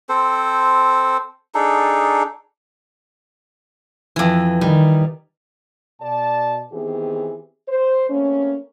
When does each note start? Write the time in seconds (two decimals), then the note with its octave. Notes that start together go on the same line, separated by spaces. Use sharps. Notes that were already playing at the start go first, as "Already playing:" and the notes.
0.09 C4 A4 C5
1.55 D4 D#4 G#4 A4
4.16 F2 E3
4.61 D#3 G3
6.01 B2 D5 A5
6.72 D#3 E3 B3 C4 G4 G#4
7.68 C5
8.10 A3 A#3 C4 C#4